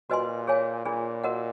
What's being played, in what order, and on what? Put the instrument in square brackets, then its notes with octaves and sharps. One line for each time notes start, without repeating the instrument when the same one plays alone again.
[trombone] A#2 [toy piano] F#4 B4 D#5 G#5 C6
[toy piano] G#4 C#5 F5 G#5
[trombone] A#2 [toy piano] D4 F4 G#4
[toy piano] F#4 A#4 D#5 F#5